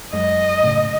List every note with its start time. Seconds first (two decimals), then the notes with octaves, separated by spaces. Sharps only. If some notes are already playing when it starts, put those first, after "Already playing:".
0.13 F#2 G#3 D#5
0.63 A2 C#3